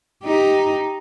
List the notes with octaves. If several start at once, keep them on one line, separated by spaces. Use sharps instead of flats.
D#4 G4